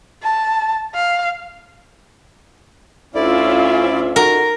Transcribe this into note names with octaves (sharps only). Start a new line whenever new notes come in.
A5
F5
D2 C#4 E4 F4 D5 E5
D#3 F#4 A#4